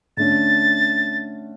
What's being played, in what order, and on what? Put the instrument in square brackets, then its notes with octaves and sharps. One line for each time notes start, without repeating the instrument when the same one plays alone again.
[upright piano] D3 A3 C#4 [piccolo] A6